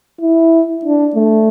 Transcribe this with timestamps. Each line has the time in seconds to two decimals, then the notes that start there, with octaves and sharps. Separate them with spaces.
0.21 E4
0.85 D4
1.16 A3